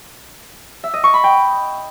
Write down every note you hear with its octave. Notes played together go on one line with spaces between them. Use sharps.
E5
D#5
C#6
B5
G5